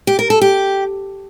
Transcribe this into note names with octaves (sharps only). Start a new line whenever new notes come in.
G4
A#4
A4
G4